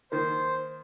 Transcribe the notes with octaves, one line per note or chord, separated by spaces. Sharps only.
D#3 A#3 C5